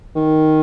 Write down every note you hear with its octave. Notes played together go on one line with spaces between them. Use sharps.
D#3